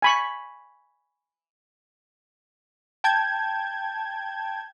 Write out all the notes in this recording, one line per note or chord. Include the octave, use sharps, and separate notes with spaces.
G#5 B5 C#6
G5 A5 G6 G#6